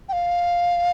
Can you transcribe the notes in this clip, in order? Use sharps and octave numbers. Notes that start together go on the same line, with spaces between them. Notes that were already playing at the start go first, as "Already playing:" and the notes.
G5
F5